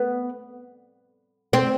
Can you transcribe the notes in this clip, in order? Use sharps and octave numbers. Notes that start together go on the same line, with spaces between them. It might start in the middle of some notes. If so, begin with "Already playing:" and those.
Already playing: B3
C4